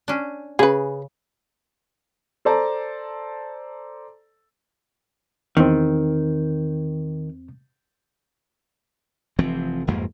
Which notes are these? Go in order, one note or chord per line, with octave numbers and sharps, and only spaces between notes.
C#4 D4
C#3 G#4 B4
A4 C5 D5 A5 A#5
E2 D#3 C4
F1 E3 F3 C4
G1 F2 G#2 A#3